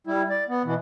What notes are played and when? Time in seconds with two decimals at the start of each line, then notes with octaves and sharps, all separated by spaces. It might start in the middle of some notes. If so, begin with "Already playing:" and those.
0.07 G3 E4
0.30 D5
0.49 B3
0.65 B2 E3